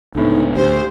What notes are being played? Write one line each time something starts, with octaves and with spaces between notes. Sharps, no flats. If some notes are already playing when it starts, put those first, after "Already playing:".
C#2 A2 D3 B3 D#4
D2 G4 C5